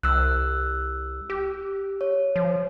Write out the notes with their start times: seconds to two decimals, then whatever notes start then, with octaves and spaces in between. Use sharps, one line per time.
0.03 C2 E6 F#6
1.30 G4
2.01 C#5
2.36 F3